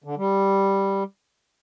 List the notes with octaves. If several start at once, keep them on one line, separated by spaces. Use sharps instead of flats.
D3
G3